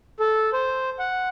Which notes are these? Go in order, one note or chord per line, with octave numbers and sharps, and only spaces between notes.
A4
C5
F#5